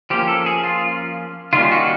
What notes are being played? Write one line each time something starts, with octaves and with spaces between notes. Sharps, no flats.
F3 A#3 C#4 G4
A4
G#4
F4
D#3 G3 A#3 C#4 F4
F#4